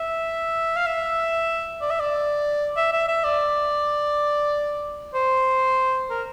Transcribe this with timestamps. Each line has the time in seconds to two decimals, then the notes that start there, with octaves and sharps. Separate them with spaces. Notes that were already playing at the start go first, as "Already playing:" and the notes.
Already playing: E5
0.76 F5
0.86 E5
1.81 D5
1.90 E5
2.00 D5
2.77 E5
2.93 E5
3.08 E5
3.24 D5
5.15 C5
6.10 A#4